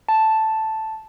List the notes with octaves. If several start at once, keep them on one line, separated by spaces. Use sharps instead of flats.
A5